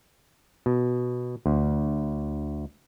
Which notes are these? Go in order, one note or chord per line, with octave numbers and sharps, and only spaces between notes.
B2
D2